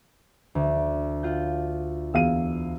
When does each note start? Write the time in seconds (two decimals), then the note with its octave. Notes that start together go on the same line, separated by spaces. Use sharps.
0.55 D2
1.23 F4 F#5 G6
2.14 E2 F5 E6 D#7